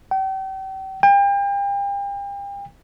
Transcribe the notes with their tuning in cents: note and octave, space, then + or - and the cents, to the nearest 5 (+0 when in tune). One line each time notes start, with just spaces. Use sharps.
G5 -40
G5 +35